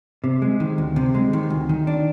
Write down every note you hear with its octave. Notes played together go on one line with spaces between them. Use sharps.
C3
G#3
D#3
D2
C3
G#3
D#3
D2
D#3
D4